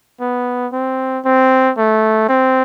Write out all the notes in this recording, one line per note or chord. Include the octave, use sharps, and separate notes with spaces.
B3
C4
C4
A3
C4